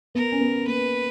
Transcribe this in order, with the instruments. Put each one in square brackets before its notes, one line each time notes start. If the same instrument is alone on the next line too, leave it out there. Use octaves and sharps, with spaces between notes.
[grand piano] B3 [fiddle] A#4
[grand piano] C#4
B3
[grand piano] A#3 [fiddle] B4